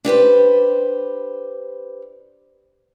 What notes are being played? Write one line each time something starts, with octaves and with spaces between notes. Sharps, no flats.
D4 G4 B4 C5